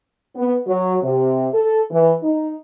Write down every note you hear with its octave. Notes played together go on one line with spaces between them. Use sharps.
B3
F#3
C3
A4
E3
D#4